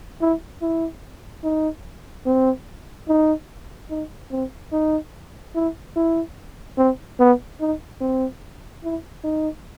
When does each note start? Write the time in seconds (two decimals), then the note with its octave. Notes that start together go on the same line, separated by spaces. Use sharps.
0.21 E4
0.62 E4
1.44 D#4
2.26 C4
3.08 D#4
3.90 D#4
4.32 C4
4.73 D#4
5.55 E4
5.96 E4
6.78 C4
7.20 B3
7.60 D#4
8.01 C4
8.84 E4
9.24 D#4